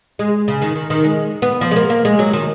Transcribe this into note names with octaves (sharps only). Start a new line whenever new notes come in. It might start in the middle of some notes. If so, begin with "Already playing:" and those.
G#3
C#3
D#3
D#3
D#3
G#3
B3
F3
G#3
A#3
A#3
G#3
F#3
D#3